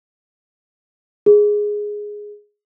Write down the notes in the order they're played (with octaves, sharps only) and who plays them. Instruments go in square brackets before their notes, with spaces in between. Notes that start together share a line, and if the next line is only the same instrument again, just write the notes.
[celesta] G#4